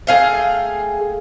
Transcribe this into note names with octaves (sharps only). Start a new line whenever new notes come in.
A3 G#4 F5 G5